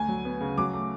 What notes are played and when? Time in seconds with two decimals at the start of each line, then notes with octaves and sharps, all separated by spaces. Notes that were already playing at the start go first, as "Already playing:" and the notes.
Already playing: D2 G#5
0.08 F#3
0.25 B3
0.41 C#3
0.58 F#3 D6
0.73 A3